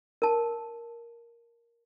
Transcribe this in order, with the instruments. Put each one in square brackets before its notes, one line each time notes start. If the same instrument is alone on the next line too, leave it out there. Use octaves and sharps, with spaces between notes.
[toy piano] A#4 A5